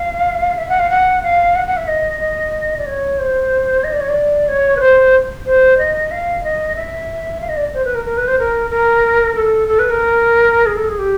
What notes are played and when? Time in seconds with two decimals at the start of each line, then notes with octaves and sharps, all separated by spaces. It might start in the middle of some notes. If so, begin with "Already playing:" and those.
Already playing: F5
0.58 E5
0.69 F#5
0.79 F5
0.90 F#5
1.23 F5
1.56 F#5
1.67 F#5
1.77 E5
1.88 D#5
2.20 D#5
2.78 D5
2.86 C#5
3.19 C5
3.84 D#5
3.93 D5
4.01 C#5
4.09 D5
4.49 C#5
4.77 B4
4.80 C5
5.46 C5
5.78 D#5
6.11 F5
6.44 D#5
6.76 E5
7.41 F5
7.49 D#5
7.57 D5
7.74 C5
7.85 B4
7.95 A#4
8.05 A#4
8.17 B4
8.28 C5
8.39 A#4
8.70 A#4
9.36 A4
9.68 A4
9.79 B4
9.90 A#4
10.66 G#4
10.77 A4
10.88 G#4
10.99 G4